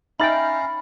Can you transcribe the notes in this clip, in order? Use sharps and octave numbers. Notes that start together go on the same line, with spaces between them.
C#4 D#4 E5 F5 G5 A#5 B5 A6